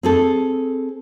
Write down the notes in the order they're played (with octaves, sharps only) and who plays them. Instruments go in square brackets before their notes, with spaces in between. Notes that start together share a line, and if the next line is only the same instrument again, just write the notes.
[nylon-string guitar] C4 G#4 A4